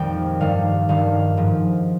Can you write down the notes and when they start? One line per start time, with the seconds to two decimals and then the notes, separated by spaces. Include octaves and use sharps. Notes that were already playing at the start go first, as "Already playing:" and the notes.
Already playing: F2 A#2 D#3 G3 G5
0.40 G2 D#3 G3 F5
0.89 G2 D#3 G3 F5
1.37 G#2 F3